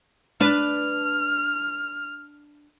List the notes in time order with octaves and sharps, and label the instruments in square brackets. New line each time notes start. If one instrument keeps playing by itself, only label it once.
[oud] D4 B4 [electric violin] F6